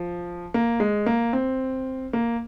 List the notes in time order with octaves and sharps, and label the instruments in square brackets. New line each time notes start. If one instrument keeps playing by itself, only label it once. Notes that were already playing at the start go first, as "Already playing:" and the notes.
Already playing: [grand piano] F3
A#3
G#3
A#3
C4
A#3